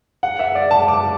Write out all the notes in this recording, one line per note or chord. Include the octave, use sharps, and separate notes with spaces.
F#5
E5
D5
A5
D6